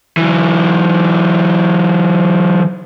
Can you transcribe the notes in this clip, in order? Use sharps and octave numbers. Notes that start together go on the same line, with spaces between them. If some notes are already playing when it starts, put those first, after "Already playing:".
E3 F#3